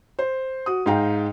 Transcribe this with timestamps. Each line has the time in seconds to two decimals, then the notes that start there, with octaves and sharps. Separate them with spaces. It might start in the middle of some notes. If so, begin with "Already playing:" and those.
0.19 C5
0.66 F#4 D#6
0.86 G#2 D#4 F5 G5 A#5